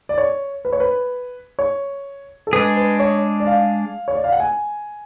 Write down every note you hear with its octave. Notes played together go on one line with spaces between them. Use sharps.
D5
C#5
B4
C#5
B4
C#5
A4
G#3 D4 G#4 B4
B4
C#5
D5
F5
C#5
D5
F5
F#5
G#5